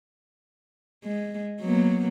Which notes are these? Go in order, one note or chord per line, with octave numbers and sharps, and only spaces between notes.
G#3
F#3 A#3 B3